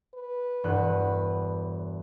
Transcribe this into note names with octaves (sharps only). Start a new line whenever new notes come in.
B4
E1 G2 F#6